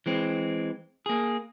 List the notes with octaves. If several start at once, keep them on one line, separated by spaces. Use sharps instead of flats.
E3 G#3 C4
A#3 G#4